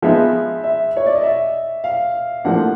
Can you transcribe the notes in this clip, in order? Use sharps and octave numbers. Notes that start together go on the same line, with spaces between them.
F3 G#3 B3 D#4 E5
E5
C#5
D5
D#5
E5
F5
A2 F3 A#3 D4 F#5